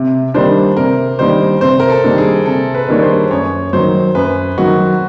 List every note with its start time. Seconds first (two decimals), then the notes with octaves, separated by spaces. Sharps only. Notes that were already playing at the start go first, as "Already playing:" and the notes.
Already playing: C3
0.34 D#3 G3 A#3 D4 C5
0.77 C3 A#4
1.19 D#3 G3 A#3 D4 C5
1.61 C3 C5
1.80 A#4
1.90 A4
2.04 D#3 G3 A#3 D4
2.18 G#4
2.46 C3 A4
2.75 B4
2.89 D#3 G3 A#3 D4 C#5
3.02 C5
3.31 F#2 C#5
3.73 D#3 F#3 C5
4.15 F#2 B4
4.58 D#3 F#3 F#4